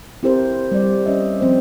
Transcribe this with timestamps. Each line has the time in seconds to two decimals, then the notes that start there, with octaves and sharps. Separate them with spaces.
0.23 C4 E4 G4 A#4 C5
0.72 G3 D5
1.06 C#4 D#5 E5
1.41 F3 C4 C5